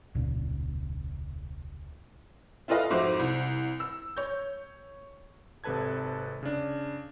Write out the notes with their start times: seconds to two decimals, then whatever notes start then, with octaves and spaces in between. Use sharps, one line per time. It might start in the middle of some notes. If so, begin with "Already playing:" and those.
0.15 E1 C#2 A#2 D4
2.68 E4 F4 A4 B4 D#5 F5
2.91 F2 G#2 F#4 C5 E5 D6
3.19 C2
3.80 E6
4.17 C#5 G6
5.64 G#1 C3 A4 B4 A5 G#6
6.43 C#3 D4